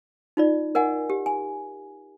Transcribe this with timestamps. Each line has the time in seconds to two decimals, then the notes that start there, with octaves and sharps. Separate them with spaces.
0.37 D#4 F4 D5
0.75 A#4 D#5 F#5 G#5
1.10 G4
1.26 G#5